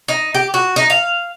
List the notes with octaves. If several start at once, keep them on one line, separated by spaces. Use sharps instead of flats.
D#4
G4
F#4
D#4
F5